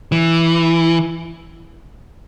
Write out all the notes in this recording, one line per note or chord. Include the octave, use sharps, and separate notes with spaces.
E3